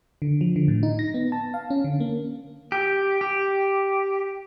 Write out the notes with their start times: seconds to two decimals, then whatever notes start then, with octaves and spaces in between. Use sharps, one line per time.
0.22 D3
0.41 F3
0.56 D3
0.68 A2
0.83 D#4
0.99 A#6
1.14 B3
1.32 A5
1.54 F5
1.70 C#4
1.84 D3
2.00 A#3
2.72 G4
3.21 G4